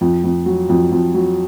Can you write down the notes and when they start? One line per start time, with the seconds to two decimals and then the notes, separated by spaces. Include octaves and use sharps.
0.01 F2
0.24 F2
0.46 F#3
0.69 F2
0.92 F2
1.15 F#3